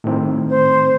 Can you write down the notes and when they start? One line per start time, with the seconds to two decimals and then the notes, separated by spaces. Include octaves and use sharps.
0.04 A2 D#3 C4
0.49 C5